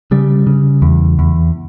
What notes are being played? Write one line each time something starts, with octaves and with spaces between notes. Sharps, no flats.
C#3 G3
C#3
E2
E2